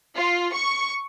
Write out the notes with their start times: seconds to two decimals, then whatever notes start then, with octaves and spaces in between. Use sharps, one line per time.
0.15 F4
0.52 C#6